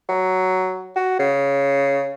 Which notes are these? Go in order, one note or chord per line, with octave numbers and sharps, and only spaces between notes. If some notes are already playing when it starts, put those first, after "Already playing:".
F#3
F#4
C#3